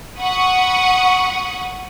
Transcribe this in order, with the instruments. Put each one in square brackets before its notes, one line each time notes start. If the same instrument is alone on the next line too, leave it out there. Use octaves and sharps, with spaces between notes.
[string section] F#5 B5 C#6 D#6